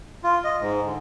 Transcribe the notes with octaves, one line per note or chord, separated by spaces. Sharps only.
F4
D#5
G#2
D3